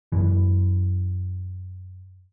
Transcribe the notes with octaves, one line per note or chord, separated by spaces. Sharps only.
F#2 E3